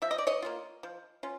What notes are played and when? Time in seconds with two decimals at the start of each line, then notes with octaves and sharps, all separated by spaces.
0.02 F3 E5
0.11 D#5
0.18 D5
0.27 C#5 D#5
0.42 A#3 C#4 F4
0.83 F3
1.23 C#4 F4